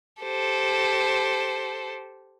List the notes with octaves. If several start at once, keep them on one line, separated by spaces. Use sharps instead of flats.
G4 A4 C5